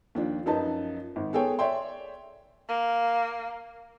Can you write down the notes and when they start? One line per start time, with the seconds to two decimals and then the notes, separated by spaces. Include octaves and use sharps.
0.15 D#2 F3 D4
0.46 F#2 F3 D#4 B4 A5
1.16 G#1
1.33 B3 G#4 A4 C#5 G5
1.59 C#5 D5 E5 G5 C6
2.69 A#3